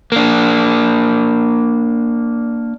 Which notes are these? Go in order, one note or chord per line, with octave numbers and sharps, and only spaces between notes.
A#3 D4